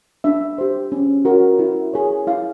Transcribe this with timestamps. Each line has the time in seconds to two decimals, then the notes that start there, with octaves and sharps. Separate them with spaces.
0.24 D4 E5
0.58 G4 C5
0.92 C#4
1.25 F#4 A#4 C#5
1.59 E4
1.93 G#4 C#5
2.27 E4 F5